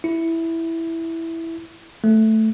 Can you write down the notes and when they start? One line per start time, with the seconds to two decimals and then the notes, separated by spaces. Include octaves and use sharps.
0.04 E4
2.04 A3